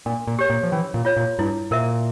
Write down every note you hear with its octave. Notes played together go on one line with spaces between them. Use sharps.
A#2 D4
A#2
G4 C#5
A#2
F3
E3 C#4
A#2
F4 C#5
A#2
G2 E4
A#2 A#4 E5